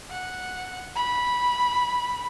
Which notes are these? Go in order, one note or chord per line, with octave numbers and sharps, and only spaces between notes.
F#5
B5